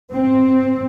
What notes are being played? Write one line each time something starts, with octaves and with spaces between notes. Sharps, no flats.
C4